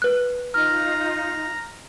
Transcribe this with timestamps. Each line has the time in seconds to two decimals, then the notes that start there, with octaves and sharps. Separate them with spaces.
0.02 B4 F#6
0.54 D#4 F4 A#5 F6